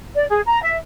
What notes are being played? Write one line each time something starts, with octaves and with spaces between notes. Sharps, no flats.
D5
G#4
A#5
E5